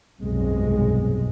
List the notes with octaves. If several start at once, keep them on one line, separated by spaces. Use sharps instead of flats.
F1 B1 G2 C3 G#3